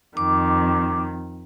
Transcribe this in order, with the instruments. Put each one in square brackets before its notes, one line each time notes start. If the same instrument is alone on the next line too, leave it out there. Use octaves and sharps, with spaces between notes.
[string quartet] F2 D#3 [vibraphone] D6